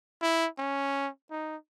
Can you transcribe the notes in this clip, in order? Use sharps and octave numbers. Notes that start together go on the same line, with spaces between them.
E4
C#4
D#4